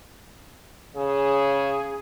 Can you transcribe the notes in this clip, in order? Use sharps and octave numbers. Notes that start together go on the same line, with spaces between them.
C#3 G#4